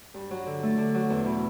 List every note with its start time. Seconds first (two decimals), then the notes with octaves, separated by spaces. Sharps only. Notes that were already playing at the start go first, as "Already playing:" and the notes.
0.14 G2
0.31 F#3
0.46 D3
0.63 A3
0.78 D3
0.94 F#3
1.10 E2
1.25 B2